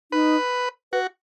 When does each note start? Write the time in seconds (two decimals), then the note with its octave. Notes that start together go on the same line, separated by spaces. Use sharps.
0.12 D#4 B4
0.92 F#4 B4